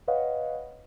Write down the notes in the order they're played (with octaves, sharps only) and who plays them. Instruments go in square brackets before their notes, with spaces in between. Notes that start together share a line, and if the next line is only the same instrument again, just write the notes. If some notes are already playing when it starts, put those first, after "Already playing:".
[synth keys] B4 C#5 D#5 F5 F#5